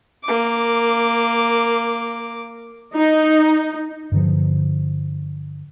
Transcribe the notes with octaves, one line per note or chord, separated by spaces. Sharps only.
A#3 D6
D#4
G2 D3 F3